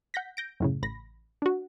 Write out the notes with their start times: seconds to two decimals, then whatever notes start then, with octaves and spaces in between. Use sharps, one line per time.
0.14 F#5 G6 A#6 B6
0.37 G6 A#6 D7
0.60 F#2 A2 C#3
0.83 A1 B5 A#6
1.42 D4 F#4